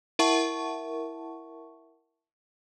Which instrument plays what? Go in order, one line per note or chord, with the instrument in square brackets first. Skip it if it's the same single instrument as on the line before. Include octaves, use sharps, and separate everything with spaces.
[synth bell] E4 A#4 E5 F#5 A5 C#6